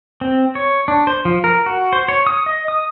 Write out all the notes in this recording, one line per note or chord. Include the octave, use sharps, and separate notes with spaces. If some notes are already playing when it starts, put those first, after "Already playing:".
C4
C#5
D4
C5
F3
A#4
F#4
C5
C#5
D#6
D#5
D#6